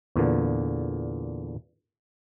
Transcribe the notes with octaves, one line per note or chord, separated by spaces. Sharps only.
E2 A#2 D3